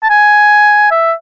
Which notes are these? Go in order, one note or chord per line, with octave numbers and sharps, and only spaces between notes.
A5
G#5
E5